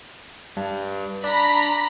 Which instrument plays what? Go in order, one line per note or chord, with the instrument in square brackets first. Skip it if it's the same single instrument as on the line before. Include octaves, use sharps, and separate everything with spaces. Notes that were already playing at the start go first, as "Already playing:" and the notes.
[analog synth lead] G2
[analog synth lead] D4 [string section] A#5 B5